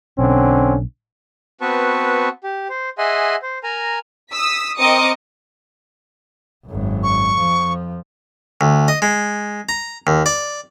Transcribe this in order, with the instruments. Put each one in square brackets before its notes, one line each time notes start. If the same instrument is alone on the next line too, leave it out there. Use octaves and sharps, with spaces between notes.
[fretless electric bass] B1 B2 [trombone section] D3 C4 C#4
[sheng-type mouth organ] B3 C4 F#4 B4 A5 C#6
G4
C5
G#4 D#5 E5 F#5 G#5 C6
C5
A#4 G#5 A#5
[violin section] D#6 E6 B6
C4 A#4 D#5 D6 D#6 C#7
[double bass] G#1 F#2
[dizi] C#6
[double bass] F2 F3
[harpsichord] D2
D#5
G#3
A#5
D#2
D5